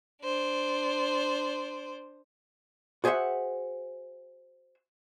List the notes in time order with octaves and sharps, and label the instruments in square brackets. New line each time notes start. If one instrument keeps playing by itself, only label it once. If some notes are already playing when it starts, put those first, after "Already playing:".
[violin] D4 C5
[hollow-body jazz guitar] F#4 G#4 C5 D#5 E5 F#5